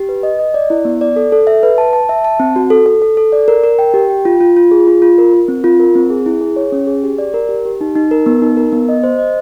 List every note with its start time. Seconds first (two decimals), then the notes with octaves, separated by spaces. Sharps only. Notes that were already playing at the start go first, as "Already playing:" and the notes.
Already playing: G4
0.09 B4
0.23 D#5
0.39 D#5
0.54 D5
0.70 E4
0.85 B3
1.01 D5
1.16 A4
1.32 A4
1.47 E5
1.63 B4
1.78 A5
1.93 A5
2.09 E5
2.24 A5
2.40 C4
2.56 F#4
2.70 A4
2.86 A4
3.02 A4
3.17 A4
3.32 D5
3.48 A#4
3.64 A#4
3.79 G5
3.94 G4
4.10 G5
4.25 F4
4.41 F4
4.56 F4
4.71 G#4
4.87 F4
5.02 F4
5.18 A#4
5.33 A#4
5.48 C4
5.64 F4
5.80 A#4
5.95 C4
6.10 G#4
6.26 E4
6.41 G#4
6.56 C#5
6.72 C#4
6.87 G#4
7.03 G4
7.18 D5
7.34 A#4
7.49 G4
7.65 G4
7.81 D#4
7.95 D#4
8.11 A#4
8.26 B3
8.42 D#4
8.57 A#4
8.73 B3
8.89 D#5
9.04 C5
9.19 D#5